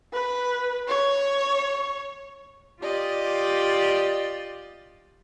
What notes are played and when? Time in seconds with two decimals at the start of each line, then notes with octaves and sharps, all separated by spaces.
0.13 B4
0.88 C#5
2.82 F4 G4 D5 D#5